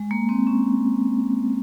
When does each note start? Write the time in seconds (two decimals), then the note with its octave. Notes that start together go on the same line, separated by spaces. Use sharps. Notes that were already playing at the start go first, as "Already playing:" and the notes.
Already playing: G#3
0.11 A#3
0.29 C4
0.47 C#4